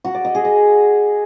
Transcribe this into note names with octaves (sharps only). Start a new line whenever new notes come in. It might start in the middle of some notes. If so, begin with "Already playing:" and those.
F#4
D5
D#5
G#4
D#5